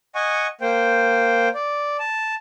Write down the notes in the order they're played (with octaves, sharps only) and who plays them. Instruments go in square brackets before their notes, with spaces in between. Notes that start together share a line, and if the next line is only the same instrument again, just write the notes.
[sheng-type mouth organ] D#5 F#5 G#5 C#6
A#3 C5 G5
D5
A5